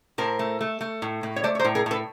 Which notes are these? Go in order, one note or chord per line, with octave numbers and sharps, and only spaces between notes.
A2 A#4 C5
A3
A3
A3
A2
A2
C#5
A3 C5 D5
C#5
A#4 C5
A2
G#4 A#4
A2 A4 B4